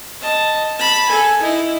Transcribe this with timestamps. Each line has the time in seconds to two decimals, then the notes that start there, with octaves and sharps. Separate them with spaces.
0.21 D#5 A5
0.77 A5 B5
1.09 A4 G#5
1.41 D#4 E4